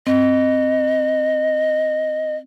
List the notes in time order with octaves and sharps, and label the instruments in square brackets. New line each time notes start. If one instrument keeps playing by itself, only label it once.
[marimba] C4 [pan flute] D#5